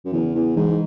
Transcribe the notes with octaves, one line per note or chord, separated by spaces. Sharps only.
F#2
E2 C#3 E3
E2
G#2 E3 G#3